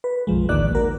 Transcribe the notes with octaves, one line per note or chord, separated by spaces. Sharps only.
B4
B1 F#2 F3 G#3
A1 D2 D#3 A#3 D5 F#6
F#4 A#4